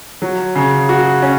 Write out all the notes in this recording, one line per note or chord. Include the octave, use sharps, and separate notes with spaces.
F#3
C#3
F#4
C#4